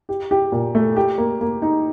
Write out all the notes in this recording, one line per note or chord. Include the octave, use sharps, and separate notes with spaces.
G4
G4
A#2
A3
G4
A#3
A#3
D#4